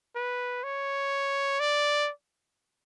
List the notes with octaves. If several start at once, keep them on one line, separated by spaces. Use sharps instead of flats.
B4
C#5
D5